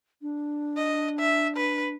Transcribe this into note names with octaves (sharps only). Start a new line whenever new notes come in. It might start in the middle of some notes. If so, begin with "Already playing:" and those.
D4
D#5
E5
B4